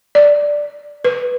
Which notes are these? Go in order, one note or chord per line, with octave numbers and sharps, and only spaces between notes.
D5
B4